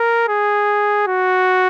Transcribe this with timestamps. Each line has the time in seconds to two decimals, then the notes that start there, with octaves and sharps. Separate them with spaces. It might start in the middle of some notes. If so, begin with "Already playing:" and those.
Already playing: A#4
0.29 G#4
1.07 F#4